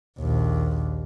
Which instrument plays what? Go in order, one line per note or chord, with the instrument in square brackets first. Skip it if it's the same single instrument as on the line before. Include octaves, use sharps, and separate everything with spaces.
[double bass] A#1 D#2